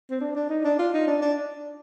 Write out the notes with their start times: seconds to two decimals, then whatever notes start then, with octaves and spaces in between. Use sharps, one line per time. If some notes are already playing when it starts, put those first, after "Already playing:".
0.10 C4
0.21 D4
0.35 D4
0.49 D#4
0.64 D4
0.79 F4
0.93 D#4
1.07 D4
1.22 D4